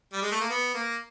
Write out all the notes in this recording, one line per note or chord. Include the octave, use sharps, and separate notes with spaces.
G3
G#3
A3
A#3
B3
A#3